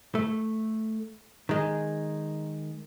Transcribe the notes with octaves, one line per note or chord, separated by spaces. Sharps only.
A3
D#3 G#3